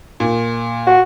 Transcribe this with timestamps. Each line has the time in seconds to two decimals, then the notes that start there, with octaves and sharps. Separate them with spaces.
0.20 A#2
0.87 F#4